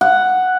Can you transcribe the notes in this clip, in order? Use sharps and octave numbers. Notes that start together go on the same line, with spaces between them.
F#5